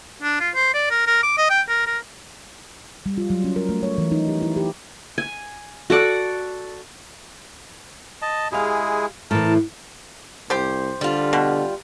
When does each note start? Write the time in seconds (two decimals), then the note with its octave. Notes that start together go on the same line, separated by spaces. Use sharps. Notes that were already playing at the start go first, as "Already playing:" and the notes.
0.22 D4
0.40 F4
0.55 C5
0.74 D5
0.90 A#4
1.07 A#4
1.23 D6
1.38 D#5
1.50 G5
1.68 A#4
1.87 A#4
3.06 G3
3.18 F4
3.30 F#3
3.44 C#4
3.56 A#4
3.69 A3
3.83 C#5
3.98 E3
4.12 D#4
4.28 G4
4.42 E4
4.57 G4
5.18 G#5
5.90 F#4 A4 D5 F#5
8.22 D#5 A5
8.52 G#3 E4 G4 G#4 F5
9.31 A2 E3 A#4 A5
10.50 C2 G4 C5
11.01 D3 G3 F4
11.33 B2